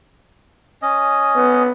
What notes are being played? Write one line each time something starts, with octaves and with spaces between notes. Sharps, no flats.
C#4 D#5
B3